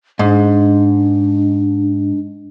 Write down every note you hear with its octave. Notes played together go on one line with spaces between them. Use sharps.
G#2 D4